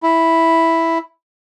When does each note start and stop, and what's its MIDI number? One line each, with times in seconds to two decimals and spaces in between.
0.03 0.98 64